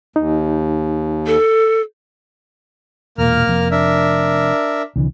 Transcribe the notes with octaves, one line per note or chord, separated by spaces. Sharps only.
D#2 D#4
A4
E1 A#2 A#3 A#4 F6
F1 F2 C4
D4 A#4 E5
C2 D3 E3